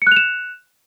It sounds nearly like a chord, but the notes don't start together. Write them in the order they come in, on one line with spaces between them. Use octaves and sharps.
C#7 F#6 F7 E7